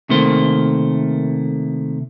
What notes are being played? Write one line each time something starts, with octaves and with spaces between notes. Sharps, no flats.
C3 D#3 A3 A#3 C5